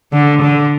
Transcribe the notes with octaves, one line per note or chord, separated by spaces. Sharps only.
D3
D3